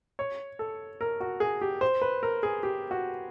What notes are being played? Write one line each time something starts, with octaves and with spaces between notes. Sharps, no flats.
C#5
A4
A#4
F#4
G#4
G4
C5
B4
A#4
G#4
G4
F#4